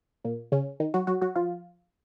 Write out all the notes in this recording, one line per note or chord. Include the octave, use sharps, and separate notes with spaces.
A#2 A#3
C#3 C#4
D#3 D#4
F#3 F#4
F#3 F#4
F#3 F#4
F3 F4